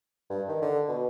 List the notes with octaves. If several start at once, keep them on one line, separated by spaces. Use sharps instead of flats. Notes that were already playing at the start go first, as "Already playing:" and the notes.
G2
D#3
D3
B2